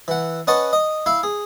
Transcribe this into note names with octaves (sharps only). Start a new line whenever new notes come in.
E3 F#5
C#4 B4 D#5 F#5 A5 C#6
D#5
E4 E5 F5
G#4